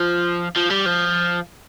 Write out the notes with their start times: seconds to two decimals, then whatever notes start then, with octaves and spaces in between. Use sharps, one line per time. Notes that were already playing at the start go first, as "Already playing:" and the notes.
Already playing: F3
0.56 F3
0.70 G3
0.86 F3